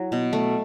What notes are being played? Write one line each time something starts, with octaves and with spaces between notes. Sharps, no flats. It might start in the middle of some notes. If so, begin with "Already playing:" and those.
Already playing: F#3 E4
B2
A3